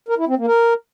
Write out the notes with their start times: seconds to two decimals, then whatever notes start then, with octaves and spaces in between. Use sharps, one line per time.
0.09 A#4
0.18 E4
0.28 C4
0.38 A#3
0.47 A#4